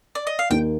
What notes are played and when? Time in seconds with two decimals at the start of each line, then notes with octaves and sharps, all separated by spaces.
0.15 D5
0.27 D#5
0.39 F5
0.50 D#2 D#3 A#3 G5